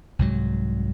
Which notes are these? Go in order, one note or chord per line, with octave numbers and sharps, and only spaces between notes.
C2 G#2 F#3